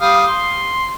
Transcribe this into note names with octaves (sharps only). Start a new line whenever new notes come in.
G3 F5 D#6
C6